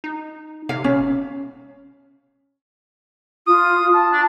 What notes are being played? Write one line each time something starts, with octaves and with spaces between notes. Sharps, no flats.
D#4
C3 F5
E1 C#4
F4 D#6
A5
D4